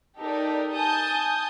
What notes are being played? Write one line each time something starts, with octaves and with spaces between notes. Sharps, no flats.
D#4 G4 A4 A#4 D5
G#5 A5 D#6 G6